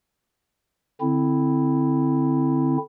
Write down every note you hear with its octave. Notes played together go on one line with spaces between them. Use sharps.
D3 C4 E4